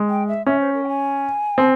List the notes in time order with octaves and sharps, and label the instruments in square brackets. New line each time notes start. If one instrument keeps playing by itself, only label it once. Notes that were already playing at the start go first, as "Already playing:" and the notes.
Already playing: [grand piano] G#3
[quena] G5
E5
[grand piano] C#4 [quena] E5
[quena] C5
A#4
G5
G#5
[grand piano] C4